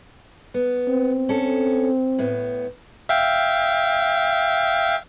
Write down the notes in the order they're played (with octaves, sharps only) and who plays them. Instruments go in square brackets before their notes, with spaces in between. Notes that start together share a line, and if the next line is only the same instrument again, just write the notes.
[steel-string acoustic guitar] B3
[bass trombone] C4
[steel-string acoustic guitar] C#4 A4
A2 B3
[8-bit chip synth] E5 F5 G5